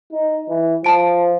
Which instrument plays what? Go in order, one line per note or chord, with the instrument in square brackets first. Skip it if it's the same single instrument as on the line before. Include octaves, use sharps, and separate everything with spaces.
[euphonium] D#4
E3
[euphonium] F3 [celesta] A5 D7